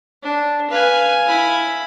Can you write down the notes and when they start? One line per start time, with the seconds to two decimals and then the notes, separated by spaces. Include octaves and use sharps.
0.23 D4
0.70 B4 F5 G#5
1.27 E4 B5